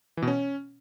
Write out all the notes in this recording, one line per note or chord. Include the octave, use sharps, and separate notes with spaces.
E3
B2
C#4